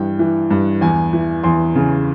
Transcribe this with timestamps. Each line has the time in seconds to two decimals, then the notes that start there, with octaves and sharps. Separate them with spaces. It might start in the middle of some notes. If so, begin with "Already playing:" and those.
Already playing: G2 E3 G5
0.19 E3
0.51 G2
0.81 E2 G#5
1.13 E3
1.43 E2 C6
1.76 C#3